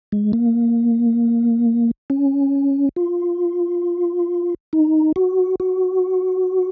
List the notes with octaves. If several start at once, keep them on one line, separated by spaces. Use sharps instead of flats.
G#3
A#3
C#4
F4
D#4
F#4
F#4